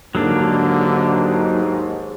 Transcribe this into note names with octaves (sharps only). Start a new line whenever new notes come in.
D#2 G#2 D3 F#3 A#3 D4